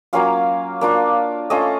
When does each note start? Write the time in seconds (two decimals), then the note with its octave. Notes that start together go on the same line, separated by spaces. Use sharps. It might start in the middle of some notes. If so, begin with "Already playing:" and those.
0.13 F#3 A#3 C#4 F4 F5
0.81 A#3 D4 F4
1.50 A3 C#4 F4 D#5